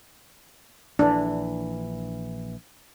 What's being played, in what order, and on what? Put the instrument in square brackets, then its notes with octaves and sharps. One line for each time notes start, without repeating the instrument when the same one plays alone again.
[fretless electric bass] A#1 E3 [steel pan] D4